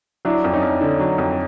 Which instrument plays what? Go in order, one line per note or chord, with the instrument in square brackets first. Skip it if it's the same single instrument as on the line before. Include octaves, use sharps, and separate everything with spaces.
[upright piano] F#3 [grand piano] D4 E4
[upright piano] F2
[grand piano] C#4 D#4
[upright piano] F2
D3
F#3
F2